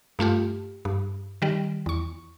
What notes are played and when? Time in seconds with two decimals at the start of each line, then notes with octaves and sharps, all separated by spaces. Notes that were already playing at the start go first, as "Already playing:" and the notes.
0.19 G2 A3 F4 G4
0.85 G2
1.42 D#3 G3
1.86 E2 C#6